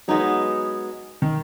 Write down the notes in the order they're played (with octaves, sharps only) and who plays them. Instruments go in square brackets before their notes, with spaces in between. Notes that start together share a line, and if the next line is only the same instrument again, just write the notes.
[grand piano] F#3 [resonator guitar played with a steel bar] G#3 B3 D#4
[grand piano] D#3